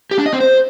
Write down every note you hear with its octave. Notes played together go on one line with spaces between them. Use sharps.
G4
D4
D#5
C4
C5